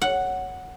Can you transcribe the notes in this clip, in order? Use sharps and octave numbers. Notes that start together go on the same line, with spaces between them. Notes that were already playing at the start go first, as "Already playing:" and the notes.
F#5